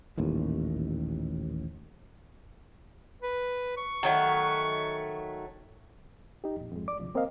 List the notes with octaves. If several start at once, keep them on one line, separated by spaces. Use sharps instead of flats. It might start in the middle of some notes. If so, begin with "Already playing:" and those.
D#1 A1 D#2
B4
C#6
D#3 F#3 A3
D#4 G4
F2 A#2
F2 G#2 G#3
D5 D6
D2 G2 C3 F3
A#3 C4 A#4 C5 D#5 F5